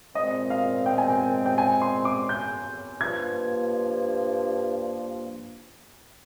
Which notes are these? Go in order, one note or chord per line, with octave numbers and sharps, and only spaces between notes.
A#2 G#3 C4 D#5
F5
G5
G#5
G5
G5
G#5
C6
D6
G6
G2 F3 A#3 G#6